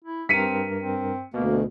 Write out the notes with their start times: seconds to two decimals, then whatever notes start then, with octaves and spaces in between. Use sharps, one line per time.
0.04 E4
0.29 G2 C4 A#4 B6 C#7 D#7
0.80 C4
1.34 D2 B2 A#3